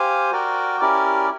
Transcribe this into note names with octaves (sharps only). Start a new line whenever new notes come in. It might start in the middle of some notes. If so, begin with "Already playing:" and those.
Already playing: G4 C5 F5 G#5
F#4 A#4 D5 G5
C#4 E4 G4 A#4 D5